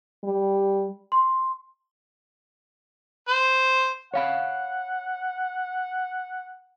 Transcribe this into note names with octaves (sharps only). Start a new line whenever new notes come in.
G3
C6
C5
C#5 F5 F#5 B5